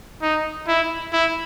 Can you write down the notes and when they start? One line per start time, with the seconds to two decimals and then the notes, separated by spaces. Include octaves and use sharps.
0.22 D#4
0.68 E4
1.13 E4